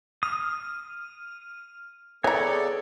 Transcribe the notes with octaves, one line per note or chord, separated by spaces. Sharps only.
D#6 F6
E3 B3 G#4 A4 C#5 D5 A#5